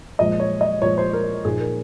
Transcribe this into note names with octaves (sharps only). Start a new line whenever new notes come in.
A#2 F3 G#3 D#5
C#5
D#5
A#2 F3 G#3 C#5
C5
A#4
A#2 F3 A#3 D#4 G#4
A#4